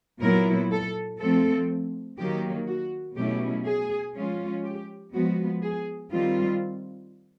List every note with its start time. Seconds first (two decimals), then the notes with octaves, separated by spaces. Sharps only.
0.21 A#2 F#3 B3 E4 A#4
0.71 A4
1.19 F3 A3 C4 A4
2.18 D#3 F#3 A#3 G4
2.67 F#4
3.17 B2 F#3 A3 C#4 E4 G4
3.66 G#4
4.15 F3 G#3 C#4 F4
4.64 G4
5.13 F3 G#3 B3 F#4
5.62 G#4
6.11 D#3 G3 C4 F4